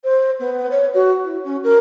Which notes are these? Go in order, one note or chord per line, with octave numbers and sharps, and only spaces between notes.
C5
B3
C#5
F#4
E4
C#4
A#4